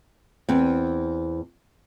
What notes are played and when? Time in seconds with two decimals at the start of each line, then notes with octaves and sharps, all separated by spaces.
0.49 E2 C4